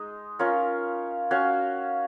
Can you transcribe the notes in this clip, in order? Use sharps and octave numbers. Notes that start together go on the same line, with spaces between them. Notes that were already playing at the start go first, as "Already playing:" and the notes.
Already playing: G#3 D#4
C#4 F4 A#4 C#5
C#4 F#4 C#5 F5